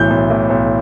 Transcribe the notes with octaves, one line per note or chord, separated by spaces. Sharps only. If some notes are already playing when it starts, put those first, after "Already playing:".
Already playing: B1 A2 E3 G6
B1
A2 E3
B1